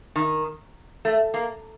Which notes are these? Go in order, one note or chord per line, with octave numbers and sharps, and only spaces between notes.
D#3
A3
A#3